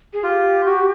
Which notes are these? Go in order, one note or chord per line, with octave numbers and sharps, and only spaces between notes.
G#4
F4 G4
F#4